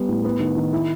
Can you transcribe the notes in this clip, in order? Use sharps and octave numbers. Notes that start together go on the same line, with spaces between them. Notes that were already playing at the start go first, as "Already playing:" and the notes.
Already playing: G3 B3
A2
B3
D#3
D#3
E4